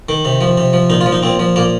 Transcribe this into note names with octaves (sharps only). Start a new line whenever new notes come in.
D#3
C3
F3
C3
F3
A#2 D#4
F4
F3
D#4
A#2 C4
F3
A#2 A#3